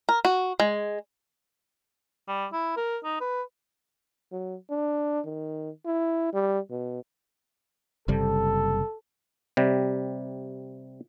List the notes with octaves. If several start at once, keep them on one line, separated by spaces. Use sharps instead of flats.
A#4
F#4
G#3
G3
E4
A#4
D#4
B4
F#3
D4
D#3
E4
G3
B2
F#1 C3 G3 A4
C3 G3